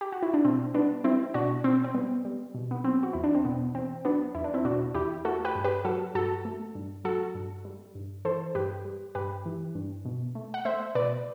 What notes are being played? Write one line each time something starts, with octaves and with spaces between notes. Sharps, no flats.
G4
F#4
E4
D4
B2 C4
G3 B3 D4
G3 C4 E4
B2 D4 F#4
B2 C4
C4
G3 B3
G3
B2
B3
F#3 C4
F#4
E2 E4
D4
C4
B2 B3
E2 C4
F#3 B3 D4
E2 E4
D4
C4 E4
B2 D4 F#4
E2 E4 G4
A3 F#4 A4
G4 B4
G2
G4 B4
F#3 F#4 A4
G2 F#4 A4
A3
G2
F#3 F#4 A4
G2
G3
G2
E3 A4 C5
G2 G4 B4
G3
G2 G4 B4
E3
G2
B2
A3
F#5
A3 C5 E5
B2 B4 D5